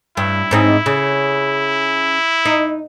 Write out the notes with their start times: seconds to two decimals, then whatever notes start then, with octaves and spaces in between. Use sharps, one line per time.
0.17 G2 E4
0.51 G#2 C4 D#4
0.86 C#3
2.45 D#4